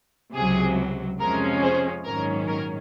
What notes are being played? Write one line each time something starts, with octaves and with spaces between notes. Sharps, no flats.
C#2 C3 F#3 G#4
F2 C3 F3 G#3 C#4 A#4
G#4 C5
A#1 G#2 D#3 F#3 C#4 A#4
A#4